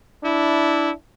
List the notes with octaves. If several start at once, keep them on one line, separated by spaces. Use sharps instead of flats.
D4 E4